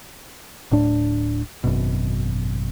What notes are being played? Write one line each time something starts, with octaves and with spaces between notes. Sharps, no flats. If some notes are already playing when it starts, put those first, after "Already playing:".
D1 A2 D4
G#1 F#2 B2